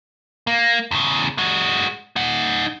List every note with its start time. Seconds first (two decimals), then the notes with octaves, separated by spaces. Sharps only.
0.47 A#3
0.91 E2 C#3
1.38 G#3 F#4
2.16 D#4 F#5